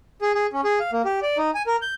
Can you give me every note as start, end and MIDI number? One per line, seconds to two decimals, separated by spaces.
0.21 0.32 68
0.35 0.47 68
0.53 0.61 61
0.64 0.79 68
0.80 0.91 77
0.93 1.02 58
1.05 1.20 67
1.22 1.38 74
1.38 1.51 63
1.55 1.62 80
1.67 1.76 70
1.82 1.95 91